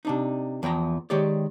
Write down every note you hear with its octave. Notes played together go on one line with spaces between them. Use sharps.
C3 D4 D#4
E2 F3 G5 A#5
D#3 G#3 G4 C#5 D5